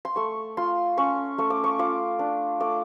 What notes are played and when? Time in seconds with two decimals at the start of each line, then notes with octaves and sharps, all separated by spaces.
0.05 C6
0.16 A3 C#6
0.57 F4 C6
0.98 C#4 C#6
1.38 A3 C#6
1.50 D6
1.64 C#6
1.79 F4 D6
2.19 D4
2.60 A3 D6